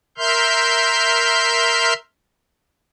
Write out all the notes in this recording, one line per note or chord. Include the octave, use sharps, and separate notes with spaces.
A#4 E5 C6 F6 G6